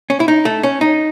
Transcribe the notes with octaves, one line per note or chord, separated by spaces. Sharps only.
C#4
E4
D#4
A3
C#4
D#4